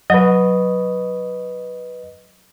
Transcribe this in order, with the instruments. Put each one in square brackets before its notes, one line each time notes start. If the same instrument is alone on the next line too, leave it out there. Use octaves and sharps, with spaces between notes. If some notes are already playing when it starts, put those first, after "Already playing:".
[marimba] F#3 [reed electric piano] B4 D#5